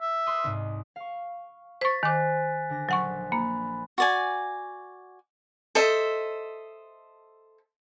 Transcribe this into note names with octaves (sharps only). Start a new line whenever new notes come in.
E5
B4 C6 D#6
C2 G#2
F5 C#6
C5 C#6 A6 B6
D#3 C5 G#5 D6 F#6
D3 D4 A#6
A#1 F#3 F#5 C#6
A#3 B5
F#4 D5 G#5
A4 C5 D#5 E5